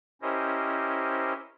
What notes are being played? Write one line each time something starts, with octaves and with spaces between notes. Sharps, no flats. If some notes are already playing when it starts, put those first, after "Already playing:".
C#4 E4 G4 A#4 C5 D#5